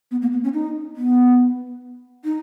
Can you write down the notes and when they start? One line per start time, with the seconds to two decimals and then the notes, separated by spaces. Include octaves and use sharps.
0.11 B3
0.22 A#3
0.32 B3
0.43 C#4
0.54 D#4
0.96 B3
2.25 D#4